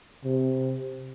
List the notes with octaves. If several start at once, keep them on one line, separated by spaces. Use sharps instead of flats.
C3